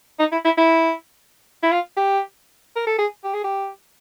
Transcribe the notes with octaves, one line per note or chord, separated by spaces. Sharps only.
D#4
E4
E4
E4
E4
F4
G4
A#4
A4
G#4
G4
G#4
G4